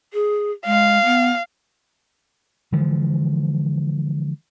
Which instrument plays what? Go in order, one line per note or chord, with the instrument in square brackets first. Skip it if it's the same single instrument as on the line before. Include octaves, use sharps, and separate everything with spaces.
[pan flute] G#4
[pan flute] G#3 [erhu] F5
[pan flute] B3
[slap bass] D3 E3 F3 G#3